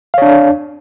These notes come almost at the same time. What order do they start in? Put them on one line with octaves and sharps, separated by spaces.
F5 C#5 D4